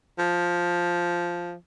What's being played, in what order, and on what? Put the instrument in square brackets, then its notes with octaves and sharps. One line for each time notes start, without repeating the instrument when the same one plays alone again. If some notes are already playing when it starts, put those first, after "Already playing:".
[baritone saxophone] F3